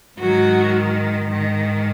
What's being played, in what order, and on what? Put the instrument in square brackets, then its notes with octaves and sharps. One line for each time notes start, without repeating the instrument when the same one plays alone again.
[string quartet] G#2 D#3 F#3 F#4
G#2 D#3